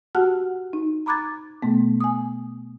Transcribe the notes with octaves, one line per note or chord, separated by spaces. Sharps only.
F#4 G4 F#5 A5 F6 F#6
D#4
A#5 B5 D6 F#6 G#6 A6
B2 A3 B3
G#5 D#6